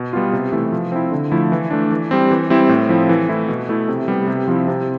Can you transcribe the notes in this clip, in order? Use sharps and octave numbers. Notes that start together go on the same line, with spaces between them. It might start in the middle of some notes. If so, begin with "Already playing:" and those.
Already playing: B2
G3 B3 F4
C3
E3 A3 E4
F3
C4 E4
D3
F3 A3 E4
E3
A3 D4
E3
G3 C4
E3
G3 C4 E4
A2
F3 C4 E4
E3
A3 E4
B2
A3 E4
C3
G3 B3
C3
F3 C4 E4
C3